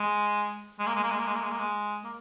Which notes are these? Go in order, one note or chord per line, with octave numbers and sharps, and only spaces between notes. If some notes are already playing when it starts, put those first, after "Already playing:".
Already playing: G#3
G#3
A#3
G#3
A#3
G#3
A#3
G#3
A#3
G#3
A#3
G#3
A#3